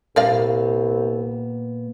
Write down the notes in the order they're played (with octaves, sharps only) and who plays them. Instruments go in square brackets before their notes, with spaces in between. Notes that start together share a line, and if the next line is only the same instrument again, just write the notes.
[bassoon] C2 [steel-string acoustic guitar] A#2 A#3 B3 [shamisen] A#4 D5 F5